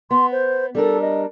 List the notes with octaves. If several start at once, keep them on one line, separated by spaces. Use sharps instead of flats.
B3 C6
C5
G3 D4 A4 A#4
D#5